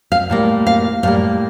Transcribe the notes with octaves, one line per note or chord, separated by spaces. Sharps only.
F5
A2 G3 A#3
F5
A2 G3 A#3 F5